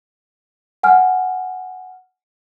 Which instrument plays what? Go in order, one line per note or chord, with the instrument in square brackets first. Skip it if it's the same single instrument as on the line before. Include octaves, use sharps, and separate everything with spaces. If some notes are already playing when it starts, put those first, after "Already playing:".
[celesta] F#5 G#5 F6